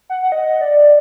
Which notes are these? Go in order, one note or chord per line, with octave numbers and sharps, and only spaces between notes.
F#5
F#5
D#5
D5